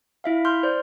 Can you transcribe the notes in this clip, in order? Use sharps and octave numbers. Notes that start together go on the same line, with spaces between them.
E4 E5 F5
C6 F6 G6
C5 D5